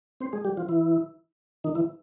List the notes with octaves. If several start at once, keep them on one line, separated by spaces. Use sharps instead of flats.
C4 C5
G#3 G#4
G3 G4
F3 F4
E3 E4
D#3 D#4
E3 E4